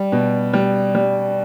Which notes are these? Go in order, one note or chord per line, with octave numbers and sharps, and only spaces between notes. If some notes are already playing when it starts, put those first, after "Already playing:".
Already playing: G3
B2
G3
G3